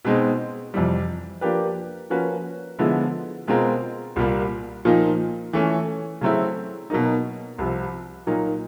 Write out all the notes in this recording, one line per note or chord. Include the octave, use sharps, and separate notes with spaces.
B2 G#3 C4 D#4
F2 C3 E3 G3
F3 A#3 D4 G4 B4
F3 A#3 C#4 F#4 B4
D3 F3 G#3 B3 E4
B2 G#3 C4 F4 A#4
C2 A#2 G3 A#3
A#2 F3 A#3 D#4
E3 A3 C#4
C#3 F#3 A3 C4 E4
B2 F#3 A#3 D#4
C2 C3 F3
A#2 F#3 A#3 D#4